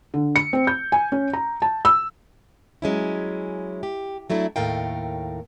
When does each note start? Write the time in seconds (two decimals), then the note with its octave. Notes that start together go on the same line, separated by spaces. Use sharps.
0.14 D3
0.36 C#7
0.53 C4
0.67 G6
0.92 G#5
1.12 C#4
1.33 A#5
1.62 A5
1.85 E6
2.82 F#3 G#3 C#4 E4
3.83 G4
4.30 F#3 A3 D4 E4
4.56 D#2 A2 A3 A#4 F5 G5